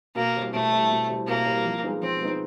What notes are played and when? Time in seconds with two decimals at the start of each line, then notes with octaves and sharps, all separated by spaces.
0.15 B2 A#3
0.35 G3 C4 E4
0.53 B2 A3
0.71 G3 C4 E4
0.90 B2
1.09 G3 C4 E4
1.27 B2 A#3
1.46 G3 C4 E4
1.65 F3
1.83 G#3 B3 D#4
2.01 F3 C4
2.21 G#3 B3 D#4